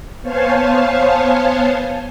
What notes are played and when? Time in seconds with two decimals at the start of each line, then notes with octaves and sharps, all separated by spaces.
0.23 B3 C5 C#5 F5 G#5 A5